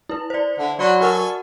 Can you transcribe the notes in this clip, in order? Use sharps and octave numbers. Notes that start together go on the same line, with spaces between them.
E4 B4
C5 D5
D3 E4
F#3 B4 D5 F#5 C6
F#4 A4 A#4 F#5 G#5 C#6